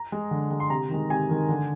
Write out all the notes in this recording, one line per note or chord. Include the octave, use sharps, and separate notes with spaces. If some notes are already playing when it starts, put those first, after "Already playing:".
Already playing: A#5
G#3
D3
G#3
C6
C3 A#5
D#3 G#3
C3 G#5
D#3 G#3
D3